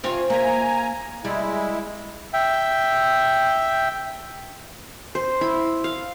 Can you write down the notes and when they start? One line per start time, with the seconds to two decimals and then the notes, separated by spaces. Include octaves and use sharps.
0.04 C3 C4 C#4 F4
0.30 A#3 E5 G#5 A#5
1.25 G3 G#3 E4
2.33 E5 G5
5.15 C5
5.41 E4
5.84 F5